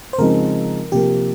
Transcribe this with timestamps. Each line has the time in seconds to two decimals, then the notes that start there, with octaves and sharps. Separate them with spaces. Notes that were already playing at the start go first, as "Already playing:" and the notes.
0.13 C5
0.18 C#3 F3 G#3 C4 D#4 A#4
0.92 C3 F3 A#3 G4